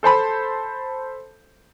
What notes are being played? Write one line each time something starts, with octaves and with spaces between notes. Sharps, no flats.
A4 C5 A5 B5